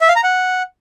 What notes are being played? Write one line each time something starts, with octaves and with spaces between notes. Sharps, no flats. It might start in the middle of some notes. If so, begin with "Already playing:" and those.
E5
F5
A#5
F#5